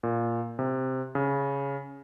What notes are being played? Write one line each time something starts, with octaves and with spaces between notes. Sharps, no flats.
A#2
C3
C#3